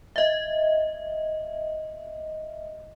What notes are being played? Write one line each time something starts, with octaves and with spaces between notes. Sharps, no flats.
D#5 E5